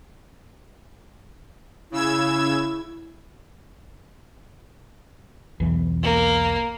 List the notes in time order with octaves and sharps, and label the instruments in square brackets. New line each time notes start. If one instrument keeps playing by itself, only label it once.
[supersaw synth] C#3 E6 G#6 [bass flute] E4
[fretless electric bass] B1 E2 E3
[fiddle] A#3